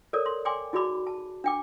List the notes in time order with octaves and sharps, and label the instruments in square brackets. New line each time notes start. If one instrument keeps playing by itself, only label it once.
[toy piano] A4 A#4 C#5 D5
C6
D5 G5 G#5 C6 D6
D#4 F#4 G#4 D5 B5 D6
A5
D4 G5 D6